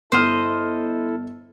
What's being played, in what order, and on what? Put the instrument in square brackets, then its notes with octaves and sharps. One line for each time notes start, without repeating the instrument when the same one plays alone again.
[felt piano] G1 F6 [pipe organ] E4 A4 [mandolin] C5 D#5